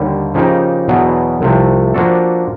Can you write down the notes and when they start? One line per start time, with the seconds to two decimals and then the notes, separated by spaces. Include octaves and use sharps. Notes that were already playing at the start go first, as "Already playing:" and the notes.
Already playing: D#2 D3 G3
0.34 C#3 F3 A#3 D#4 G4
0.88 E2 B2 F#3 B3
1.41 C2 C3 F3 A3
1.94 F3 A#3 D4 F#4 A4